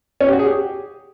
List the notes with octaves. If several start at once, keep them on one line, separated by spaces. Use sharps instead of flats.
C#4
G4
F#4
G#4
G4